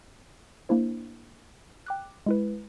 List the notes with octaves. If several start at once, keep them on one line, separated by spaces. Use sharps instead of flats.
A#3 D4 E4 C5
G5 D6 F#6
G#3 E4 B4